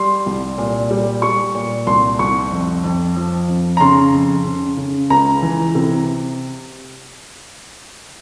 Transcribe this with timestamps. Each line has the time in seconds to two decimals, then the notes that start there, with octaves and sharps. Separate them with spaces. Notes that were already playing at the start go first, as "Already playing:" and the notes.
Already playing: G3 C6
0.26 C2
0.58 A#2
0.91 G3
1.22 G3 C#6
1.55 A#2
1.87 C2 C6
2.19 C2 C#6
2.52 F2
2.84 F2
3.16 F3
3.48 F2
3.77 A#5
3.80 C#3 C6
4.13 F2
4.45 C#3
4.77 C#3
5.10 C#2 A#5
5.42 E3
5.75 C3